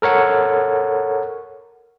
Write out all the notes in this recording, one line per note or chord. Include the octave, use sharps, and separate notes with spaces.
A4 A#4 C#5 F#5